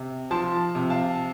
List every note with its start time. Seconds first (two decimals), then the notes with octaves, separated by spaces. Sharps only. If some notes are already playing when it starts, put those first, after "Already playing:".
Already playing: C3
0.31 F3 A5 C6
0.75 C3
0.90 F5 A5